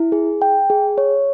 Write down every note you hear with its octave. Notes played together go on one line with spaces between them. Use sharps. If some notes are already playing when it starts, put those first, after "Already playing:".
Already playing: E4
G#4
G5
G#4
C#5